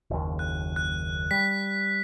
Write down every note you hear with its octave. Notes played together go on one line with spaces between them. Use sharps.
F#1 D#2
F#6
F#6
G3 B6